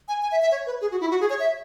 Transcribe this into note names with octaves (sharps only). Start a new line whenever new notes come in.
G#5
G#5
E5
E5
C#5
B4
G#4
F#4
E4
F#4
G#4
C#5
E5